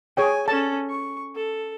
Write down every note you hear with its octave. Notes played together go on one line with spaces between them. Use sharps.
G#4 C#5 G5 G#5
C#4 A4 A5
C#6
A4